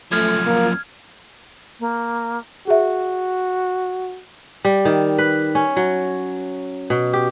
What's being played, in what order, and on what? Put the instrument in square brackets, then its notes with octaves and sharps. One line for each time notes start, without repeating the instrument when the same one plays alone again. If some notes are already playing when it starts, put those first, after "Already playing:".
[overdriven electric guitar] F#2 F3 [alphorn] A3 [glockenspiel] F6 G#6
[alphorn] A#3
[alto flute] A#3
[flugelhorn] F#4 [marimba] G#4 E5
[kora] G3
D#3
B4
C#4
F#3
B2
G4